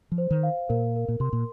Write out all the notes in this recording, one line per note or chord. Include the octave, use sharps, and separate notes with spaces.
F3
C5
D#3
F5
A#2 A#4
A#4
A#2
C3 C6
A#2